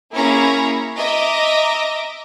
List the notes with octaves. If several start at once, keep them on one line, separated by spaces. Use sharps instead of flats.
A#3 C#4 E4 G#4 C#5 A#5
D#5 E5 A#5 D6